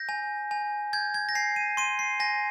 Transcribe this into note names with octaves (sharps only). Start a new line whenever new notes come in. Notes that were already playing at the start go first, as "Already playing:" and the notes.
Already playing: G6 A#6
G#5
G#5
G6 G#6
G#6
A#6
G#5 C7
D#7
C6 D#7
C7
G#5 A#6